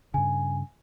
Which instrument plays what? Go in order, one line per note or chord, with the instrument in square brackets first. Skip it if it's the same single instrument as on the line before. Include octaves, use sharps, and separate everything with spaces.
[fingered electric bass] G2 C#3 [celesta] G#5